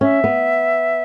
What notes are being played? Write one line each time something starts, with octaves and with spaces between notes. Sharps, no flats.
C#4 E5
B3